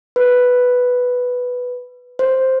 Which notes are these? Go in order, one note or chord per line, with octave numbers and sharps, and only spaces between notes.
B4
C5